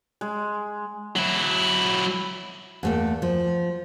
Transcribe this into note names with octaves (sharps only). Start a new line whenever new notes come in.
G#3
F#3 E4
E2 A3 A#3
F3